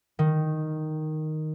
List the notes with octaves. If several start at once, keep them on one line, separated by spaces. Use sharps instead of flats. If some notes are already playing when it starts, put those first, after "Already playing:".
D#3